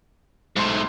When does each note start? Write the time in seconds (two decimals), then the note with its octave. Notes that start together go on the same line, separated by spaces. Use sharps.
0.56 B1 G#2 A3 C6